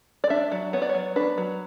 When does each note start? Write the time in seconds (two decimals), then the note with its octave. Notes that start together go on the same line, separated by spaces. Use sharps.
0.24 D5
0.30 D4 E5
0.52 F#3
0.73 B3 C#5
0.82 D5
0.89 C#5
0.95 F#3
1.16 D4 B4
1.38 F#3